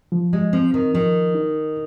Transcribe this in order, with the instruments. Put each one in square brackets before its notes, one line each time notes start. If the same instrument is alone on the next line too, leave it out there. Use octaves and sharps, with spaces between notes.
[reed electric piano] F3
[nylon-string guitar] G#3
[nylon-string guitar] F3 [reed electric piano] C4
[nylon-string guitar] D#3
[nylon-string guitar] D#3 [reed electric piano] F3
[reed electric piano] D#4